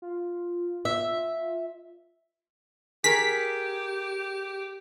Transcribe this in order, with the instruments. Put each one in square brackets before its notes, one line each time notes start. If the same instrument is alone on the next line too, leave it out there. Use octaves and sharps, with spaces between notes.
[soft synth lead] F4
[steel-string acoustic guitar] E5
[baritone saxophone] G4 [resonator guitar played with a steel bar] G#4 A#4 [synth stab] B6